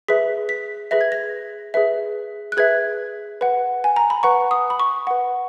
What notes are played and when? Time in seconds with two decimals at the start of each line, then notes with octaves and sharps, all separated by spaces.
0.08 G#4 B4 E5 B6
0.49 B6
0.91 G#4 B4 E5 A#6
1.01 G#6
1.12 A#6
1.74 G#4 B4 E5
2.52 F#6
2.57 G#4 B4 E5 G#6
3.41 B4 F#5
3.84 G#5
3.96 A#5
4.10 B5
4.23 B4 F#5 C#6
4.51 D#6
4.70 B5
4.80 C#6
5.07 B4 F#5